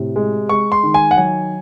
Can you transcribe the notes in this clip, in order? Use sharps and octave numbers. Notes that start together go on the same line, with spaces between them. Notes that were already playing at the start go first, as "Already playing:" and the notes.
Already playing: A2 C3
G#3
G#3 C#6
C6
D#3
G#5
F#5
F#3 G#5